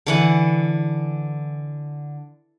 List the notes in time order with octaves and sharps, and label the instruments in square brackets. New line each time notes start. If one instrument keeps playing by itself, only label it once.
[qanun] D3 E3 F#5